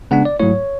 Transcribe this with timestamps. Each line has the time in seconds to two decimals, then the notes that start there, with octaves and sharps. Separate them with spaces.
0.11 C#3 G#3 B3 D4 F#5
0.25 D5
0.40 G#2 F#3 A3 E4 C#5